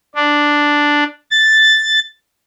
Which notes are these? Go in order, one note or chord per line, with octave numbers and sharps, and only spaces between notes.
D4
A6